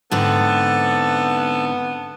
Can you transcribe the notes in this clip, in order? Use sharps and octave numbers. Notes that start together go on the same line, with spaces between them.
G#2 D3 B3 C4 A4 A5